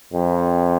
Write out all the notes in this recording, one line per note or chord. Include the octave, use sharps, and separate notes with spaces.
F2